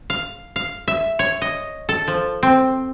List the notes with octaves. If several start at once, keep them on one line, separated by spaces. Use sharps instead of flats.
F5
F5
E5
C#5
D#5
A4
F3
C4